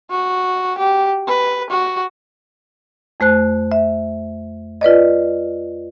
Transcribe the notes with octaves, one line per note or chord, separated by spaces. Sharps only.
F#4
G4
B4
F#4
F2 A3 C5 F#6
E5
F4 B4 D5 D#5